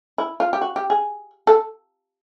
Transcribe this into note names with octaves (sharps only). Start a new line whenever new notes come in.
E4
F4
G4
F#4
G4
G#4
A4